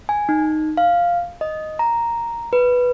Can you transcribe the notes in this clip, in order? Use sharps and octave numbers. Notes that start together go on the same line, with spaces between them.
G#5
D#4
F5
D#5
A#5
B4